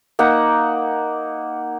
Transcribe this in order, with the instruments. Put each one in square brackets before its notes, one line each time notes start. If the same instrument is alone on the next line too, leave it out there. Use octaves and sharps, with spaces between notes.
[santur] A#3 D#4 F#5